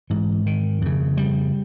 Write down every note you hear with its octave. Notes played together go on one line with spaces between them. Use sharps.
G#2 E3
D#3
F2 C#3
G3